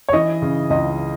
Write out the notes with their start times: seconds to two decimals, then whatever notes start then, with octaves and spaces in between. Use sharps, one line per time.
0.09 C#5
0.13 E3 D#5
0.42 C#3
0.70 C#2 D#5